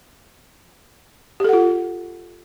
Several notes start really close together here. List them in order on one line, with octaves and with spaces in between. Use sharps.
G4 A4 F#5 F4